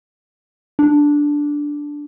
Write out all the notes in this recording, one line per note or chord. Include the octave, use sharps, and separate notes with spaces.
D4